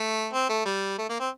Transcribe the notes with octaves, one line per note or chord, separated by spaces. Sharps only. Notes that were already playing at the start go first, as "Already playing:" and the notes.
Already playing: A3
C4
A3
G3
A3
A#3
C4